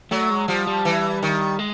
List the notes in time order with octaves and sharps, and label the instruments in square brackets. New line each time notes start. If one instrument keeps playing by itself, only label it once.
[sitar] F#3 [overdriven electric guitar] A3
[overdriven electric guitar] G#3
[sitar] F3 [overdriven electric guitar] G3
[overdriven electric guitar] G3
[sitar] E3
D#3
[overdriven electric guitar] G#3